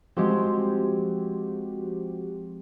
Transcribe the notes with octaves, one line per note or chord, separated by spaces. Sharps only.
F3 G#3 C4 F#4 G4